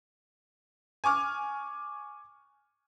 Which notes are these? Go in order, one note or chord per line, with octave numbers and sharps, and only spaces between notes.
G#5 C#6 D6 F6